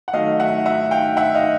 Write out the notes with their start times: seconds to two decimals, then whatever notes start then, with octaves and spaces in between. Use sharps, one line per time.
0.08 F#5
0.13 D#3 F#3 A3 D#5 F5
0.40 E5 F#5
0.66 E5 F#5
0.91 F5 G5
1.17 E5 F#5
1.34 D#5 F5